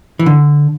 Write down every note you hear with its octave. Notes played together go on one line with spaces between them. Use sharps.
E3
D3